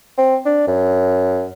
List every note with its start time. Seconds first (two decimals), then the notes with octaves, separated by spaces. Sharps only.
0.18 C4
0.46 D4
0.67 F#2